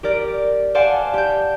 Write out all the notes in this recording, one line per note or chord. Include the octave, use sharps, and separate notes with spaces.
G4 A#4 D5
C5 D5 F5 F#5 G#5 A5
G4 G6